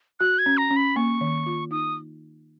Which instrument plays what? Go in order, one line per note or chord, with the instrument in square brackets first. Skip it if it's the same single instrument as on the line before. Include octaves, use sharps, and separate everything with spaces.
[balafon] F#4 [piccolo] F#6
[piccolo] G#6
[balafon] C#4
[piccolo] A#5
[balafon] C#4
[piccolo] B5
[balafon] A#3 [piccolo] C#6
[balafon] D#3
F4
[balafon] D#4 [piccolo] D#6